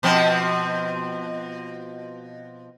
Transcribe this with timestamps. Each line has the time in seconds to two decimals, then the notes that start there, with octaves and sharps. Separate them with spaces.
0.03 B2 F3 C4